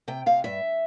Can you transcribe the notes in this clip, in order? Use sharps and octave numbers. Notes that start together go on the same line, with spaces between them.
C3 G5
C3 F5
G2 E5